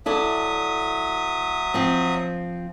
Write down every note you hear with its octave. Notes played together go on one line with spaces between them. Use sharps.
F#3 E4 A4 D5 E5 D#6
F3 C4